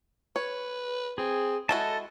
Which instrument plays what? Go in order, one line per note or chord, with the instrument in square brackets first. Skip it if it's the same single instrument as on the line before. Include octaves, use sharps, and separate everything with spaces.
[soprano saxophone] B4 [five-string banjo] C#5
[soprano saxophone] C4 [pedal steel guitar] G#4
[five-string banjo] G#3 E4 F#4 [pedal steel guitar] A4 A5 [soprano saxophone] D#5